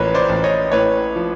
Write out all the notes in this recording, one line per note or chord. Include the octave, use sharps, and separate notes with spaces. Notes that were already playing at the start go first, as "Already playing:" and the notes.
Already playing: A1 F3 A#4 B4 C#5
C5 D5
A1
C#5 D#5
A2 B4 C#5
F3